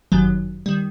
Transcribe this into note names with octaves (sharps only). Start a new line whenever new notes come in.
G1 F#2 D#3 F#3
D#3 G3